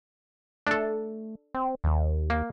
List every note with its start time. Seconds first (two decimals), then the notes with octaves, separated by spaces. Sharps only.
0.67 A3 D4 A4
1.54 C4
1.84 D#2
2.30 A#3